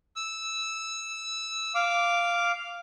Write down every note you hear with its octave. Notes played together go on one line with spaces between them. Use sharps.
E6
F5 D6